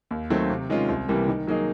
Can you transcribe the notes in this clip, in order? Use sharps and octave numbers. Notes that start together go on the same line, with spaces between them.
D#2
D#3 F#3 A3 C4
C3
D#3 G#3 C#4 F4
C2
C3 E3 G3 A#3
D#3
F#3 A#3 D#4 G#4